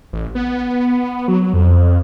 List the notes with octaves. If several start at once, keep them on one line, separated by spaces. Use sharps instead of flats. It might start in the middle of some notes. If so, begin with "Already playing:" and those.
A1
B3
F#3
F2